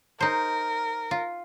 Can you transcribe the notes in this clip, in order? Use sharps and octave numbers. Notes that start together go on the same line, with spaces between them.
D#4 A#4 C5
F4